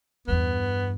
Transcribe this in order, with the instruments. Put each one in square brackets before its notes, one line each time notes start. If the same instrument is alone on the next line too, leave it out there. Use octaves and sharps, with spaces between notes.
[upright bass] E2 G2 [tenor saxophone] B3